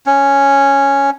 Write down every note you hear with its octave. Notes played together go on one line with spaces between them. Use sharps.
C#4